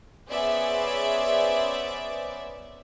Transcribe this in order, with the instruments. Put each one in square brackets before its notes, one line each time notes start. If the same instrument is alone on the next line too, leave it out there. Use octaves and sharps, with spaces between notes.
[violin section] B3 C#4 G#4 C5 D5 E5